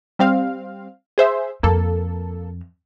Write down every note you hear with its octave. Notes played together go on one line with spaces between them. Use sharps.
G3 C4 F5
G#4 C5 E5
F2 A#3 A4